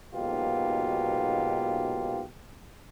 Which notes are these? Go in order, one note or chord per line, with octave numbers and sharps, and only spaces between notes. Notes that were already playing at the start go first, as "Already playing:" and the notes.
B1 G#2 B2 A#3 F4 G4